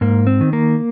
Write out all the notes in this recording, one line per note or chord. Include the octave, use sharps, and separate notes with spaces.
G#2 A#3
C4
D#3
A#3